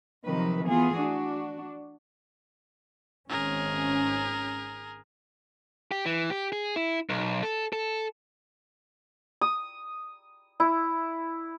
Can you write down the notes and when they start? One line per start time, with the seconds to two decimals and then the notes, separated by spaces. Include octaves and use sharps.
0.24 C3 D#3 F3 F#3 B4
0.67 E3 A3 B3 F4 G#4
0.96 D4 F#4
3.29 G#1 C#4 G#4 A#4
5.91 G4
6.06 E3
6.30 G4
6.52 G#4
6.76 E4
7.09 B1
7.43 A4
7.73 A4
9.41 D#6
10.60 E4